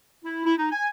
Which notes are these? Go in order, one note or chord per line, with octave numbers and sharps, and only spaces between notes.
E4
E4
D#4
G#5